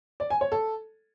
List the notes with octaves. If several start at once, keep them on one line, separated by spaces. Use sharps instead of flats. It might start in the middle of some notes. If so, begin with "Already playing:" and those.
D5
G#5
C#5
A4